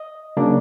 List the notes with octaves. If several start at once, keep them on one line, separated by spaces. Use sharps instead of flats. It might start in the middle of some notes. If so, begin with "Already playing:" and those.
Already playing: D#5
C#3 F#3 A#3 D4